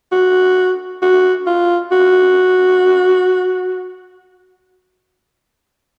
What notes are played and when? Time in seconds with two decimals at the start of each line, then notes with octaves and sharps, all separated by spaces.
0.12 F#4
1.02 F#4
1.46 F4
1.92 F#4